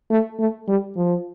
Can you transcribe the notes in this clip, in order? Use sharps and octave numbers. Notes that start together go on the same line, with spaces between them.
A3
A3
G3
F3